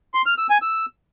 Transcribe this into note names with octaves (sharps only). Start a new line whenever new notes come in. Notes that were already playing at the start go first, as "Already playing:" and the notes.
C6
F6
E6
G#5
E6